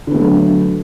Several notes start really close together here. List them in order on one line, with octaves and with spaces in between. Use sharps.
D3 B3 A3 F#3